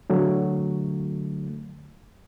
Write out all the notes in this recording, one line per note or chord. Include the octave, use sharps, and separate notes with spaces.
D3 F#3 A3